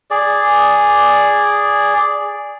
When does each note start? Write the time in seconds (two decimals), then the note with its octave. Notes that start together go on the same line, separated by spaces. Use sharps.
0.11 G#4 D5